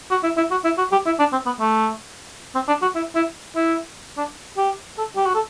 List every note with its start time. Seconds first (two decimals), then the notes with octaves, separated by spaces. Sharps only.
0.11 F#4
0.24 E4
0.37 E4
0.51 F#4
0.64 E4
0.78 F#4
0.92 G4
1.06 E4
1.19 D4
1.33 C4
1.46 B3
1.60 A3
2.55 C4
2.68 D4
2.82 F#4
2.95 E4
3.15 E4
3.56 E4
4.17 D4
4.57 G4
4.98 A4
5.16 G4
5.26 F#4
5.35 A4